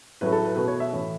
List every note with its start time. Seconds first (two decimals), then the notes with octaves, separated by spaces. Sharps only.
0.21 A2 F#3 A3 B4
0.32 A4
0.45 B4
0.56 B2 A3 B4
0.68 C#5
0.80 E5
0.92 A2 E3 A3